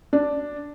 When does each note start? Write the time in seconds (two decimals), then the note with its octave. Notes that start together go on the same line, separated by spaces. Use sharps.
0.13 D4